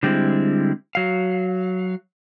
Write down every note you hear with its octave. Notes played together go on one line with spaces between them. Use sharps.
D3 G3 G#3 C4 E4
F#3 F5